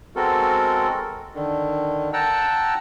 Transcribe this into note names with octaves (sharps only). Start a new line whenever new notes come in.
G#3 B3 C4 F#4 A4 A#4
D3 D#3
F#5 G5 A5 A#5 E6